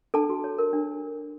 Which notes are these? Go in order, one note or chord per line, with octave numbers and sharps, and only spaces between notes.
D4 A4 A5
F#4
C#5
A#4
D4